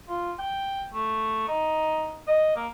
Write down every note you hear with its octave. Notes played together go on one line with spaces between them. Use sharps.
F4
G5
A3
D#4
D#5
A#3